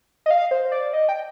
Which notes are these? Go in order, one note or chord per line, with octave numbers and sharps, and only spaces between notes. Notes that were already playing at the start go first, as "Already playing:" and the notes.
D#5
F5
C5
D5
D#5
G5